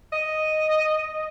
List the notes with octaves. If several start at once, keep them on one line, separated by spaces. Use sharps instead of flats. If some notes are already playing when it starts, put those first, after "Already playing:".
D#5